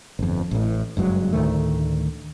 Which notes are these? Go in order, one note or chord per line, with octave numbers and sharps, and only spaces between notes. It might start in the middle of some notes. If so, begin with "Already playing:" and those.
G1 F2
A1 A2
F#1 G2 F#3 G#3
D2 A2 D#3 A3